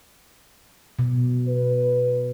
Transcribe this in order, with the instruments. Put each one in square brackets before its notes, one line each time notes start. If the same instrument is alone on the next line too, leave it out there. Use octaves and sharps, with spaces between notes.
[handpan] B2
[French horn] B4